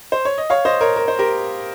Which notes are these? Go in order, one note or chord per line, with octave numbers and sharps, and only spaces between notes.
C5
C#5
D#5
C#5 F5
C5 D#5
A#4 C#5
A#4
C5
G4 A#4